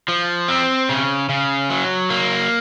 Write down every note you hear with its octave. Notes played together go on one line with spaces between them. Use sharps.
F3
C4
C#3
C#3
F#3
A#3